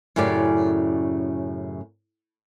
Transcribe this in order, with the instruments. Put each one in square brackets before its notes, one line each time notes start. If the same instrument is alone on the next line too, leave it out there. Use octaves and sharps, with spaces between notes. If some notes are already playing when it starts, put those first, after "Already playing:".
[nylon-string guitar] F#2 A2 C#3 G4 D5